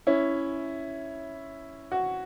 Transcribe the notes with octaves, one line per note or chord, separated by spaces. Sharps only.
C#4 E4
F#4